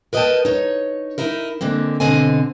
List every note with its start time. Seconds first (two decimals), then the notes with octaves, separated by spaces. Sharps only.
0.13 A#4 B4 D#5 E5 G5 A5
0.45 D#4 C#5
1.18 D#4 E4 A#4
1.61 D3 G#3 A#3 C4
2.00 B2 D3 C4 D#5 G#5